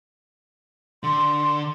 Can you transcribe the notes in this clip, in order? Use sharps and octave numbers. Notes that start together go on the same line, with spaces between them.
D3 C6